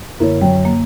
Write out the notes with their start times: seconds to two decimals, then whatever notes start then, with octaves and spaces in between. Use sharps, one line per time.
0.20 F#2 D3 A#3 E4 A#4 C#5
0.41 F#2 F#3 C#5 G5
0.65 A#3